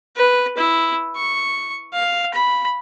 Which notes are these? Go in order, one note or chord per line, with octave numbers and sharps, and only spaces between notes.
B4
E4
C#6
F5
B5